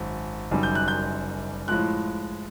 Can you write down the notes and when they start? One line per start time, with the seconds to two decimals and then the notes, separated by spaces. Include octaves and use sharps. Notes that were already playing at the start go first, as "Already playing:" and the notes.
Already playing: G#1 F#2
0.51 F#1 F#2 D#3 G3
0.63 G6
0.75 F#6
0.88 G6
1.68 A2 F3 G#3 F#6